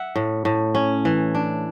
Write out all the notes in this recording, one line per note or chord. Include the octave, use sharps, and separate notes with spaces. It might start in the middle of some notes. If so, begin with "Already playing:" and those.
Already playing: E5 F#5
A2
A2
C#4
E3
D4